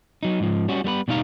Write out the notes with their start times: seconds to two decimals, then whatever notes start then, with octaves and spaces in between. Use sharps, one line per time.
0.23 F#3 D#4
0.40 G#2 F3
0.68 G3 C#4 F#4
0.84 G3 B3 A#4 B4
1.08 B2 G3 B3 D#4 F5 A#5